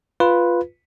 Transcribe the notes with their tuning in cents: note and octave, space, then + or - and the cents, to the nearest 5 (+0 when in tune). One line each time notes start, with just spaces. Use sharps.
F4 +0 B4 +0